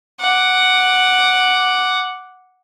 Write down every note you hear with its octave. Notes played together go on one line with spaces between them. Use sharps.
F#5 D6